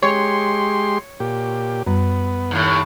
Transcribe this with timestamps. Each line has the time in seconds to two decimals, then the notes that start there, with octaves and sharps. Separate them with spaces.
0.02 G#3 G4 C#5 C6
1.20 A#2 G4
1.86 F#2 G3 B3
2.51 D#2 A2